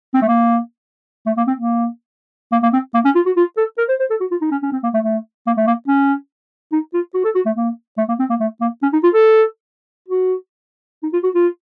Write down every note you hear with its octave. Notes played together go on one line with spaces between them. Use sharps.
C4
A3
A#3
A3
A#3
C4
A#3
A#3
A#3
C4
A#3
C#4
F4
F#4
F4
A4
A#4
C5
C5
A4
F#4
F4
D#4
C#4
C#4
C4
A#3
A3
A3
A#3
A3
A#3
C#4
D#4
F4
F#4
A4
F#4
A3
A#3
A3
A#3
C4
A#3
A3
A#3
C#4
D#4
F4
A4
F#4
D#4
F4
F#4
F4